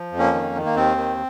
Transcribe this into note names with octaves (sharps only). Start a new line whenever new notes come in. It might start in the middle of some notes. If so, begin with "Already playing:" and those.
Already playing: F3
F2
A#3 C#4
D#3
D#3
A#3
D#2 C4
D#3